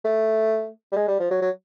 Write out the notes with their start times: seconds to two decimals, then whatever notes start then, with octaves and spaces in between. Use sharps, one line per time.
0.05 A3
0.92 G3
0.96 G#3
1.08 G3
1.20 F3
1.31 F#3
1.42 F#3